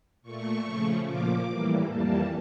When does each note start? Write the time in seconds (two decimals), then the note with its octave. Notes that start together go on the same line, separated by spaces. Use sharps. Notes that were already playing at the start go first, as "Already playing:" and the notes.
0.23 A#2 A3 C#6
0.65 C#3 F3 A3
1.06 A#2 F3 A#3 D6
1.48 A2 E3 G3 A#3
1.90 F2 E3 G3 A#3 A5